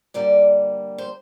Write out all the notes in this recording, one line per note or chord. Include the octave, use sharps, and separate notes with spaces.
D3 G3 A#3 D5
C5